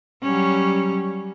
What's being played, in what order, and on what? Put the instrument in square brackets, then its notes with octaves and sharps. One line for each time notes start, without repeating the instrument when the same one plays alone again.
[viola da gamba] F#3 G3 C#4